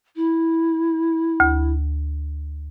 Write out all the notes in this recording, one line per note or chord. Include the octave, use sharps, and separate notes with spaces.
E4
D2